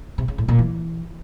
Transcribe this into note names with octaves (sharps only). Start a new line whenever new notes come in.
C3
C#3
A2
A#2
E3